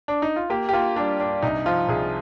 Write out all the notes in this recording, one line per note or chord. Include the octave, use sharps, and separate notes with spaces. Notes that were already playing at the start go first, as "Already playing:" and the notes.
D4
D#4
F4
A#3 G4
G4
A#3 F4
G3 D4
G2 D4
C2 D#4
F3 F4
C2 G#4